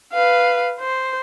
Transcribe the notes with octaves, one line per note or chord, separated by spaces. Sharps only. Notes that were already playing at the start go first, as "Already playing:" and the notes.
B4 F5
C5